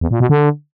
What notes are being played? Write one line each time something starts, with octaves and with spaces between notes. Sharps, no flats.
E2
A#2
B2
D3